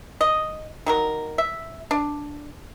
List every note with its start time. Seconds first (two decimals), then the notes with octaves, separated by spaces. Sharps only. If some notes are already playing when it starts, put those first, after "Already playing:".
0.21 D#5
0.86 D#3 F#3 A#4
1.38 E5
1.91 D4